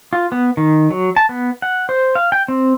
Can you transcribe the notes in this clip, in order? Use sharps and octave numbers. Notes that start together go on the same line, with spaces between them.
F4
B3
D#3
F#3
A5
B3
F#5
C5
F5
G5
C4